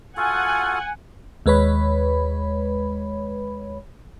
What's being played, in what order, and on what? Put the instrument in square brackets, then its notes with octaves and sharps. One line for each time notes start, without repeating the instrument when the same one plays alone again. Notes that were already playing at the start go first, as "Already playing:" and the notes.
[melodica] F4 F#4 A4 [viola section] F#5 G#5
[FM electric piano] D#2 G#3 B4 C#5 B5